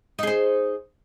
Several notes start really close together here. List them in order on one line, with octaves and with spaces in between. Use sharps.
D#4 G#4 C5